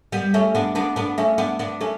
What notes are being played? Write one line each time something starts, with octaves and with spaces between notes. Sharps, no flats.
G3 B3
A3 C#4
B3 D4
B3 D4
B3 D4
A3 C#4
B3 D4
B3 D4
A3 C#4